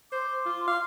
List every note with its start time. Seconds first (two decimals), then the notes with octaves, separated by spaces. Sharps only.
0.12 C5 C6 D6
0.46 F4
0.67 F5